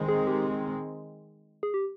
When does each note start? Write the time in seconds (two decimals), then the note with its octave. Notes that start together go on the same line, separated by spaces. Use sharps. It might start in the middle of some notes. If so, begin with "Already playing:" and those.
Already playing: D#3 G#3 C4
0.08 G#4
0.27 G4
1.63 G#4
1.74 G4